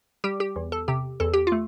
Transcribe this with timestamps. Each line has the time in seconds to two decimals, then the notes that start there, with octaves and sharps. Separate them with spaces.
0.24 G3 G4
0.40 G4
0.56 E2
0.72 A4
0.88 C3 G4
1.20 E2 A4
1.34 G4
1.47 A3 F4